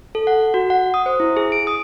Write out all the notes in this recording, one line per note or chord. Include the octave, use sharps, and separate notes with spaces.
A4
F#5
F#4
F#5
D#6
C5
E4
G#4
D7
D#6